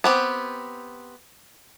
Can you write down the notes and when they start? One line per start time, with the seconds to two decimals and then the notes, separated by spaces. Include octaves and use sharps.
0.04 B3 C4 G4